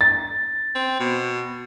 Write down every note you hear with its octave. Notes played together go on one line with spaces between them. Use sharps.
A6
C4
B2